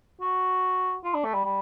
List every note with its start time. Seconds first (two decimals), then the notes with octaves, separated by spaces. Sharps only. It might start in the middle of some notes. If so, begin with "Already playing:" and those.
0.21 F#4
1.04 F4
1.14 D4
1.25 A3
1.34 G3
1.45 G3